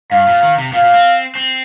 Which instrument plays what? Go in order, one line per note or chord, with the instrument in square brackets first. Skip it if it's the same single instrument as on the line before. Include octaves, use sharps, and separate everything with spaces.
[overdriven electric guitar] G2 [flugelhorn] F5
[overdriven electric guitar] A#2
D#3
C3
[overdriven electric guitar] A#2 [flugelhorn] F5
[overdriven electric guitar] A#2
C4
C4